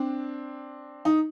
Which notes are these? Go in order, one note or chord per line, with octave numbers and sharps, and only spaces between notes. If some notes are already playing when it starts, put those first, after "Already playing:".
Already playing: C4 D4
D#4